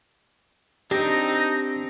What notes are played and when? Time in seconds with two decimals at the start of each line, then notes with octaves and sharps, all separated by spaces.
0.91 C4 D4 D#4 G4 A#6